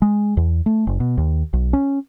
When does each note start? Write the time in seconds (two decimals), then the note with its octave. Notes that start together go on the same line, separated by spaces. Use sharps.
0.02 G#3
0.37 E2
0.66 A3
0.87 F#1
1.00 B2
1.18 D#2
1.53 B1
1.73 C#4